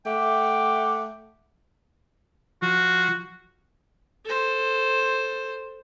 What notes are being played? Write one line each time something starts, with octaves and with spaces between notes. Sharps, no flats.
A3 F#5 G5 D6
F3 F#4
A4 C5